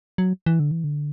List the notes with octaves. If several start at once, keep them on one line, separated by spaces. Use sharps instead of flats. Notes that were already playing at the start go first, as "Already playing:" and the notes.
F#3
E3
D3
E3
D3